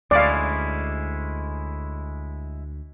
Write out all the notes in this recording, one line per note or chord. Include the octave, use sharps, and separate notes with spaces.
D2 G#3 C#4 E4 D5 F5